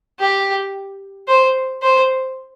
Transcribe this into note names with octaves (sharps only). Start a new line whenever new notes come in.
G4
C5
C5